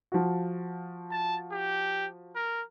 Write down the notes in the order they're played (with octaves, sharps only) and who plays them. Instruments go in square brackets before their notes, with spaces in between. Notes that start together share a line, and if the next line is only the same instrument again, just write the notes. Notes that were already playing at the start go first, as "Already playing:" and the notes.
[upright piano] F3 F#4
[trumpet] A5
G4
A#4